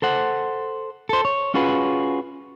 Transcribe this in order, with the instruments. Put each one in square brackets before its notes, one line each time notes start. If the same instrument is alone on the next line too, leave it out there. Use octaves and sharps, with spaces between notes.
[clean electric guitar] A4 C5 F#5
A4 C5
C#5
C#4 F4 F#4 G#4 B4